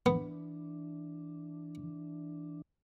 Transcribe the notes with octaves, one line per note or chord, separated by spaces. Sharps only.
E3 B3 D4